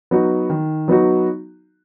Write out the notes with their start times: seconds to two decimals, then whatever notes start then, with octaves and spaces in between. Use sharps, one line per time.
0.11 F#3 B3 D#4 F#4
0.50 D#3
0.88 F#3 B3 D#4 F#4